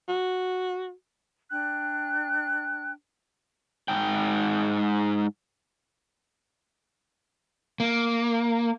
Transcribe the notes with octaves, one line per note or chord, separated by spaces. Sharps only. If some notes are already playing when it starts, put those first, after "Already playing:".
F#4
D4 G5 F#6
G#2 G5
A#3